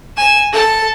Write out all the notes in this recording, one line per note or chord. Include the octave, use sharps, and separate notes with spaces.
G#5 E7
A4 A5